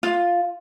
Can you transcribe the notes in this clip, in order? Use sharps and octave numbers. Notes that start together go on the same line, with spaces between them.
F4